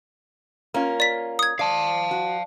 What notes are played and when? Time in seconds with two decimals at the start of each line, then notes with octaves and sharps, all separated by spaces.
0.74 A#3 C#4 F4
1.00 D5 B6
1.39 D#6 G#6
1.59 D5 F5 A5
2.11 F#4